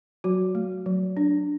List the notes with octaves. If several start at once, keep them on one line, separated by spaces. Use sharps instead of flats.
F#3 F#4
A3
F#3
D4